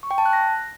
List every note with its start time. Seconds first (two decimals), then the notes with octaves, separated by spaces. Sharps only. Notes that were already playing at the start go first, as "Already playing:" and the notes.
0.03 C#6
0.11 G5
0.18 A5
0.26 F#6
0.33 A#6